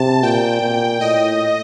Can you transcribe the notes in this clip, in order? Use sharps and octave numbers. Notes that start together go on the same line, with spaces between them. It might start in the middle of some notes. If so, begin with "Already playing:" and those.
Already playing: C3 A5
A#2 G5
A#2
A2 D#5